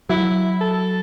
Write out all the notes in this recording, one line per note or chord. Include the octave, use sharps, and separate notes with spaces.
F#3 E4
A4